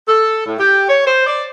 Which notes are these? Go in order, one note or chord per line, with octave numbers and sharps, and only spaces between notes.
A4
A2
G4
C#5
C5
D5